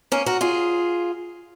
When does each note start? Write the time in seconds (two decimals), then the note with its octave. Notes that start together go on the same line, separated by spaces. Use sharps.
0.12 A#3 C#4
0.26 F#4 A#4
0.41 F4 G#4